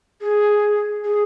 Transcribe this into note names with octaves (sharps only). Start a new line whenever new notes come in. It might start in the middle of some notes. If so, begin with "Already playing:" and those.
G#4
G#4